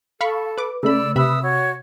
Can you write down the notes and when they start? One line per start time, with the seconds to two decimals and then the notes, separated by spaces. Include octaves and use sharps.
0.21 A4 F5 B5 C#6
0.58 B4 D6
0.83 C#3 A3 D5 B5 E6
1.16 C3 B4 E5 B5 D#6 E6
1.42 F#4 C#5